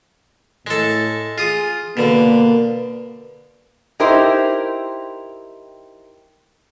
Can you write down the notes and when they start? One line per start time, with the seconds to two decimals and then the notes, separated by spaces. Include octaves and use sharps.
0.67 A2 G#3 A4
1.38 F4 G#4 D#6
1.97 B2 D3 A#3
4.00 D#4 E4 G4 A#4 C5